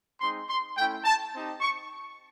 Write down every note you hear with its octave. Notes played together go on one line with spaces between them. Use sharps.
G#3 C4 D#4 C6
C6
A3 C#4 E4 G5
A5
C4 D#4 G4
C#6